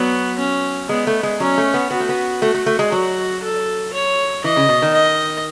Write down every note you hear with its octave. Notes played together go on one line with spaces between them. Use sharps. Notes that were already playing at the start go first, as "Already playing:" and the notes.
Already playing: F#3 B3
C#4
G#3 B3
A3
G#3
F#3 C#4
A3
B3
B3 F#4
A3
B3
A3 F#4
A3
A3
G#3
F#3 F#4
A4
C#5
E3 D#5
C#3
B2
D#3
D#5